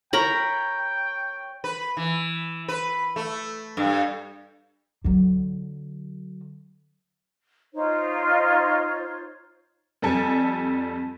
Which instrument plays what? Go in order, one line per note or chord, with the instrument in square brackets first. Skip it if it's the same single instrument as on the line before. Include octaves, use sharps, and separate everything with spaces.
[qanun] A#4 A#5 B5 [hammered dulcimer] C#5 [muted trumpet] G5
[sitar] B4
E3
B4
A3
G2
[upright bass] D3 F#3
[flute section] D#4 F4 C5 C#5
[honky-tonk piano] F2 G3 A4 G#5